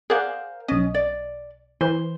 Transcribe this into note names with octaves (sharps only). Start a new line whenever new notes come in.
G#4 A#4 C5 D5 F5 F#5
B1 C#4 D#5
D5
E3 C5